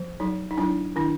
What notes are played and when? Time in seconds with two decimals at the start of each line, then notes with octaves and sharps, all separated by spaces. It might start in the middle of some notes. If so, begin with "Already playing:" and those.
Already playing: F3
0.20 F#3 D#4
0.51 D#4
0.57 F#3 D4 E4
0.96 D#3 D4 E4